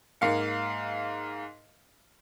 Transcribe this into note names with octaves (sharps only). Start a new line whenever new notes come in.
G#2 A#3 F5 C#7